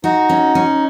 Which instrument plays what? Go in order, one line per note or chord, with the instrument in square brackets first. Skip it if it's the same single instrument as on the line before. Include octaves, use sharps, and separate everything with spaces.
[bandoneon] D#4 [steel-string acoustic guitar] F#4
[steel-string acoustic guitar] C#4
C#4